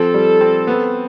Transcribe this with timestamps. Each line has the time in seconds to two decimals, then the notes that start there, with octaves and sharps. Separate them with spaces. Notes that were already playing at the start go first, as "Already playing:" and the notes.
Already playing: F3 C4 A4
0.14 G3
0.41 C4
0.67 B3